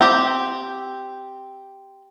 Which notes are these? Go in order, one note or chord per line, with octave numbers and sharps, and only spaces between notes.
C4 G4